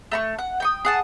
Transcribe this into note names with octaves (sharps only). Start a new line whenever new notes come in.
A3 A#5 C#6
F#5
G5 C#6 D#6
G#4 F#5 A5